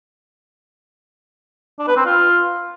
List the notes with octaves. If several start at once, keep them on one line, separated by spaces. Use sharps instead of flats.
D4
B4
C4
F4